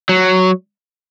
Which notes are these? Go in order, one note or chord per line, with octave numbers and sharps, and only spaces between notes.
F#3